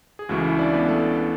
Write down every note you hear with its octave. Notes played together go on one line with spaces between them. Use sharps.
G#4
C#2 C#3 E3 A3 F#4
E4
D4 D5
B3 B4
A3 A4